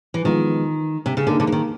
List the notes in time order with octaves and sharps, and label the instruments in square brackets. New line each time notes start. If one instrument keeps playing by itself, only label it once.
[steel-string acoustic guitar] E3
[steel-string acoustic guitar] D#3 [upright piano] F3 G#3 B3
[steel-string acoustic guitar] C3
C#3
[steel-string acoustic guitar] D3 [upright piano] A#3 D#4 G#4
[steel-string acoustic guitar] D3
E3
D#3